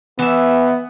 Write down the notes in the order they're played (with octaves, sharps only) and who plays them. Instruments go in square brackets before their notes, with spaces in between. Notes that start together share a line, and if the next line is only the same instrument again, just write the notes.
[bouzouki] E3 E5 [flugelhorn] B3